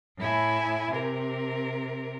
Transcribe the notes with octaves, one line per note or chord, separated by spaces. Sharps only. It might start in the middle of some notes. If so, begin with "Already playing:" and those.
A2 E4 G#5
C3 A#4